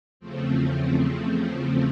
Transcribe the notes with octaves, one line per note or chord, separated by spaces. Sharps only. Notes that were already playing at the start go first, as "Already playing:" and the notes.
E2 C#3 F3 A3 C4